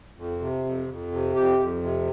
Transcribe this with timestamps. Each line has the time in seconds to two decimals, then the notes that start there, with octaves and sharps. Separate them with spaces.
0.17 F2
0.40 C3
0.65 F2
0.89 F2
1.12 C3
1.36 F2 G4
1.59 F2
1.83 C3